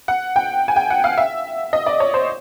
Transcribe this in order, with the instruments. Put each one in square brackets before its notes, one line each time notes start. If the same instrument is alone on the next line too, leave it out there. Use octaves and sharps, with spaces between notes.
[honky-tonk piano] F#5
G5
G#5
G5
F#5
F5
E5
D#5
D5
C#5
C5